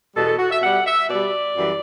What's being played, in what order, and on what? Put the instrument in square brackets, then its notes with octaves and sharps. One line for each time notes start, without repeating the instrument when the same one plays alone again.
[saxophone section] E2 B2 G3 A4
A4
F#4
E5
B2 G3 F#5
E5
B2 G3 D5
F#2 E3 G3